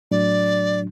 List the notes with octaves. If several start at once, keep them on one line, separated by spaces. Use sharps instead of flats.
A2 F#3 D4 D5